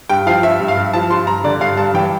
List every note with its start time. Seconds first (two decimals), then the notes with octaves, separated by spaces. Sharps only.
0.09 G2 G5
0.27 F3 F5
0.43 G2 E5
0.60 G2
0.68 F5
0.77 G2
0.93 F3 A5
1.10 G2 C6
1.27 G2 A#5
1.44 D3 D5
1.61 G2 F5
1.77 G2 A5
1.94 E3 G5